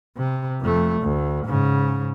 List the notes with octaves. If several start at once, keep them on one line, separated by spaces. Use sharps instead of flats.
C3
F2 A3
D2
G#2 C#3